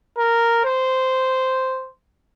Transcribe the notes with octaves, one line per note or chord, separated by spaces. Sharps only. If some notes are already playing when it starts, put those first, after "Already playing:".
A#4
C5